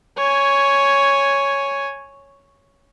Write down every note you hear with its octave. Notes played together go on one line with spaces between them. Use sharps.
C#5 G#5